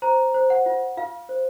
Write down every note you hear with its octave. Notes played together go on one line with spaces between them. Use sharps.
C5 A#5
C5
F#5
F4
F4 F5
C5